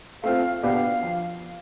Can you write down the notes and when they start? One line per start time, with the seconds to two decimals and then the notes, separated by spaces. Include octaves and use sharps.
0.22 A3 C4 F4 F5
0.63 B2 B3 D4 G4 F5
1.02 F3